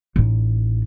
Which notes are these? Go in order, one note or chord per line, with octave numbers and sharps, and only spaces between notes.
A1 D#4